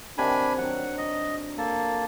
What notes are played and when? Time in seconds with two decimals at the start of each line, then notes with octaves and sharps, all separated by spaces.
0.18 C3 D#3 D4 G#5 B5
0.58 F#3 D4 F#5
0.98 D#5
1.58 A#3 A4 A5